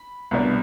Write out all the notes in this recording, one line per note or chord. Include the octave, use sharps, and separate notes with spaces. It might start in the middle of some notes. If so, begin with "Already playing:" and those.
Already playing: B5
C2 B2 B3 D4